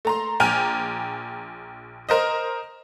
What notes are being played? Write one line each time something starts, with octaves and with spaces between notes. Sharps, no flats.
A3 A#5 C6
A#1 G5 G#5 A#5 F6
A#4 C5 D#5